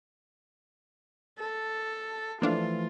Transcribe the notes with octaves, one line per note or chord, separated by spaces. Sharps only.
A4
E3 F3 A3 A#3 D4 F4 F5